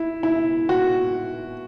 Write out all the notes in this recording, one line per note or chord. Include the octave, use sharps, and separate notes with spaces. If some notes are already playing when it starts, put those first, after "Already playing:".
Already playing: E4
E4
F#4